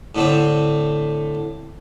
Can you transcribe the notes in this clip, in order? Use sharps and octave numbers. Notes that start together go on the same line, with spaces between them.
A2 D3 A3 C4